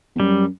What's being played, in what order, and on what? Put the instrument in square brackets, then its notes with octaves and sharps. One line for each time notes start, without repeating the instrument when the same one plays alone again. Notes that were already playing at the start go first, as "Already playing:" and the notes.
[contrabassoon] E2
[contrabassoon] F#2 [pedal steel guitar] G3